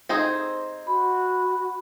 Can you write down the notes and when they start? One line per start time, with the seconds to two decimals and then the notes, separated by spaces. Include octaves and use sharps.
0.09 C4 D#4 G#4 C5
0.87 F#4 B5